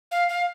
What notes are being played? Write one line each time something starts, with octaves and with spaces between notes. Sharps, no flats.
F5
F5